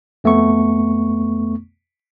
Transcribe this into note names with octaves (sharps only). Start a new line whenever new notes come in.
F2 A3 B3 C#6